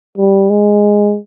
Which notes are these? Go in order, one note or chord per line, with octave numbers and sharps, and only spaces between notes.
G3
G#3